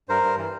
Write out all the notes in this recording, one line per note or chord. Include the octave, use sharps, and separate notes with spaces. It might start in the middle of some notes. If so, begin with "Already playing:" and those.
G2 A#4 C5
G2
E3